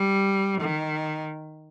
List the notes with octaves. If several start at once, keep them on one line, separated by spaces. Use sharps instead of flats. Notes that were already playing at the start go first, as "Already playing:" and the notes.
Already playing: G3
D#3